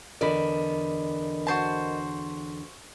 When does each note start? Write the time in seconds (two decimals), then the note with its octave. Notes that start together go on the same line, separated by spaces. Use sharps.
0.21 E2 D3 A#4 D5 D#5 B5
1.47 F#4 C5 A5